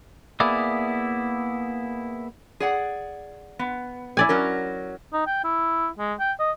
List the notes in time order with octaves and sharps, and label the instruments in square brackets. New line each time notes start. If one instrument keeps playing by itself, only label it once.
[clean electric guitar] A#3 B3 E4 G#4 D5 E5
[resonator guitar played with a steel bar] G#4 D5 F#5
B3
[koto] E4 D5 G#5
[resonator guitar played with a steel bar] F#3 C#4 A#4
[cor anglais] D#4
G5
E4
G#3
G5
D#5